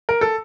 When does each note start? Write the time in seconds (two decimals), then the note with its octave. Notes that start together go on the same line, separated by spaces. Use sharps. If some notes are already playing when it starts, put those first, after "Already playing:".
0.09 A#4
0.21 A4